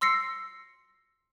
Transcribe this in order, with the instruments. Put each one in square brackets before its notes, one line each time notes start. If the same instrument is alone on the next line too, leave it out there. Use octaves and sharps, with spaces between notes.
[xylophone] C6 E6 A#6 C7 C#7